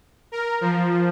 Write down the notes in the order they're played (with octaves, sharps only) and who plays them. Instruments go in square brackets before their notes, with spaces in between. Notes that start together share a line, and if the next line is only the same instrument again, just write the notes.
[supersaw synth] A#4
F3